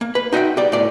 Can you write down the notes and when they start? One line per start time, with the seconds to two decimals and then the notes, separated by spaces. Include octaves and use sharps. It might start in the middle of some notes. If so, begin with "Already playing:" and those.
0.01 A#3
0.15 B4
0.33 D#4 F#4 D#5 E5 G5
0.57 G4 D5
0.72 A2 D5